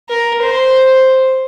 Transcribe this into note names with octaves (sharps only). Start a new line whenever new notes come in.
A#4
C5